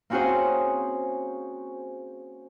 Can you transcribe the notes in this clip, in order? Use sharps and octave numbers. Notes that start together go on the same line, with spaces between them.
A#3 C4 C#4 F#4 G#4 C5